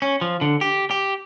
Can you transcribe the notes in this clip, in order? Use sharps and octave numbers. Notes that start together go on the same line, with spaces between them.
C#4
F3
D3
G4
G4